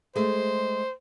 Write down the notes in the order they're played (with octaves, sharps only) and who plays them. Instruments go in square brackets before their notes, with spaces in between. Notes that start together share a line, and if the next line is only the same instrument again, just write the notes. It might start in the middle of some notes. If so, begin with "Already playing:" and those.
[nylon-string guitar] G#3 A3 [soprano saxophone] C5